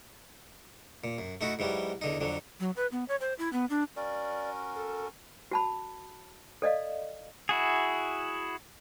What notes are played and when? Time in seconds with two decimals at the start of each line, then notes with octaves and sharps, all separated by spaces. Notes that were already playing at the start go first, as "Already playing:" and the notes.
1.04 A#2
1.19 F#2
1.41 A3 D#4 E4 F#4
1.59 G#2 E3 F#3 G3
2.01 E2 D3 D#4
2.21 F2 D3 F#3
2.60 F#3
2.76 B4
2.92 B3
3.08 C#5
3.21 C5
3.39 E4
3.53 B3
3.70 D4
3.96 C#4 F#4 A#4 D5
4.76 A4
5.51 F#4 A5 B5
6.62 A4 D5 D#5 F5
7.49 E4 F#4 G#4